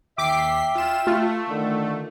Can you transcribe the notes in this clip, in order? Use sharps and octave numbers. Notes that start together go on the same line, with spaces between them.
D#2 E5 G5 D6 B6 C7
F4 E7
A3 F4
D3 D#3